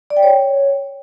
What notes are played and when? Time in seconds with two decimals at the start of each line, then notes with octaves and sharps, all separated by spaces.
0.10 D5
0.17 G5
0.23 C#5